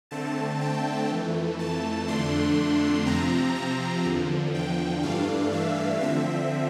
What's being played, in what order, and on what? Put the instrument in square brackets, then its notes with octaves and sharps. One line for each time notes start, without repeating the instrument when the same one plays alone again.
[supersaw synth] D3 A3 C4 A5
G5
F2 E3 A3
A5
F2 D3 A3 D4 C6
C3 F3 C4 A#5
A#5
E2 D3 F3
G5
G2 E3 A3 D4 F5
E5
D3 F3 C4 E5